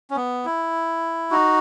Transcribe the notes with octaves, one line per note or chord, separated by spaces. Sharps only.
C#4
B3
E4
D#4 F#4